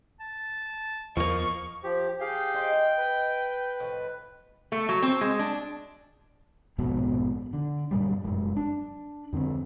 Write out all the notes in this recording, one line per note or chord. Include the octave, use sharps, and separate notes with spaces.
A5
E2 F3 A#3 D#5 C#6
F3 G4
G4 G#4 F5 G5
D#4 C5 D#5
B4
A2 D#3 F3
A3
F#3
C4
G#3
D4
A#1 F2 G#2 B2
D3
G2 A#2 F#3 G3
F1 F#2 G#3
D4
F2 D3 A#3 C4